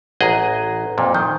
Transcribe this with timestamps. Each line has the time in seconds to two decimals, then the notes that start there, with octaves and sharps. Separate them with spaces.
0.21 A1 G#4 D#5 F#5 A#5
0.98 F2 A#2
1.15 D#3 G6